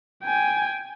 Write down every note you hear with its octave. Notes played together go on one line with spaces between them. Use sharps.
G5 G#5